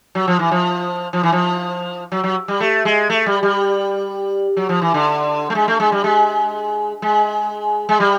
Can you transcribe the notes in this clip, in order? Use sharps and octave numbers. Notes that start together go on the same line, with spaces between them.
F#3
F3
E3
F3
F3
E3
F3
F#3
F#3
G3
A3
G#3
A3
G3
G3
F#3
F3
E3
D3
A3
G#3
A3
G#3
G3
G#3
G#3
G#3
G3